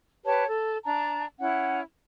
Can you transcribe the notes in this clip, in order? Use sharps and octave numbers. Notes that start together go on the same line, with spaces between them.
G4 B4 C#5 A5
A4
D4 A5 A#5
C#4 E4 F#5